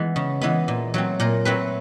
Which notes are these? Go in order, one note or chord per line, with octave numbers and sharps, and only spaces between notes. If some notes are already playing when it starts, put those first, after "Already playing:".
Already playing: E3 G#3 B3
C#3
E3 G#3 B3
A#2
F#3 A3 C4
A#2 A#4
F#3 A3 C4 B4